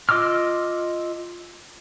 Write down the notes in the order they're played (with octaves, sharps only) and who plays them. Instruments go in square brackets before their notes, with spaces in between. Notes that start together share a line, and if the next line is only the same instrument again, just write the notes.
[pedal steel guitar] F4 D#5 D6 E6 F6